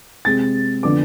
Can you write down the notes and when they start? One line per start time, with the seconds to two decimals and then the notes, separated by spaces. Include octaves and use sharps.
0.25 C3 G#3 C4 A6
0.83 D3 F3 B3 D4 D6